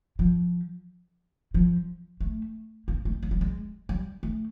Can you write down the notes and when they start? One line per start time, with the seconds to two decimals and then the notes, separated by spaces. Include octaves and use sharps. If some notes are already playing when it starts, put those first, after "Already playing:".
0.19 F3
1.54 F3
2.20 A3
2.88 A#3
3.05 A3
3.23 G#3
3.31 G3
3.41 G#3
3.89 G3
4.23 A3